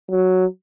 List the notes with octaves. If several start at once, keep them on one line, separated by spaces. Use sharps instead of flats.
F#3